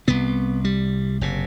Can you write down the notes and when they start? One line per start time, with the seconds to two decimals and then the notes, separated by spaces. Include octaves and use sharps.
0.08 C2 C3 B3
0.65 G3
1.21 F#1 C3